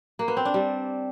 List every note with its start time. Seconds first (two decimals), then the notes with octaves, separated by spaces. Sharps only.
0.19 A#3
0.28 B3
0.37 C4
0.45 D4
0.54 G3